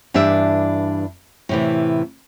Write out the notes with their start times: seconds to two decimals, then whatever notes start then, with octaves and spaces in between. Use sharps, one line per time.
0.14 G2 E3 D4 G4 E5
1.49 A2 C3 E3